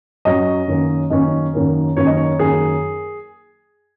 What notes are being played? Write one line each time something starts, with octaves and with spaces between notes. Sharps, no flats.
F#2 F#3 C#4 D#5
F#2 D#3 A#3 C#4
F#2 D#3 A#3 C#4 D#5
F#2 D#3 A#3 C#4
F#2 D#3 A#3 C#4 C#5
D#5
C#5
F#2 D#3 A#3 G#4